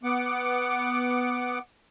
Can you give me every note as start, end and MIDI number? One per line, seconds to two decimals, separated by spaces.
0.03 1.59 59
0.03 1.59 78
0.03 1.59 86